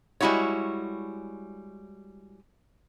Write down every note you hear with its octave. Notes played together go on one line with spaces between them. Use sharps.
G3 G#3 E4 F#4 C#5